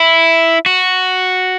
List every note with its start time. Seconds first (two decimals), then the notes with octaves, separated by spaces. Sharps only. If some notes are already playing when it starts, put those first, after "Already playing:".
Already playing: E4
0.66 F#4